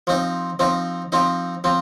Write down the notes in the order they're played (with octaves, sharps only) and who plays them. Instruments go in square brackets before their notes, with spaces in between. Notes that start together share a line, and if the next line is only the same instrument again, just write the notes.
[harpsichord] F3 C4 D#4
F3 C4 D#4
F3 C4 D#4
F3 C4